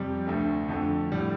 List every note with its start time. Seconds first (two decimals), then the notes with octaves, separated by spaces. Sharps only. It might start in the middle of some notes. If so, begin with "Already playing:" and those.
Already playing: F2 C3 G3
0.27 D2 D3 A3
0.68 F2 D3 A3
1.12 A2 G3